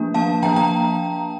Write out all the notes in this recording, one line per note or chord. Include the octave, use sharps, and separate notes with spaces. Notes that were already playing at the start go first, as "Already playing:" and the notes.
Already playing: F3 A#3 D4
F3 A#3 D4 F5 A5
F3 A#3 D4 G5 A#5
G5 A#5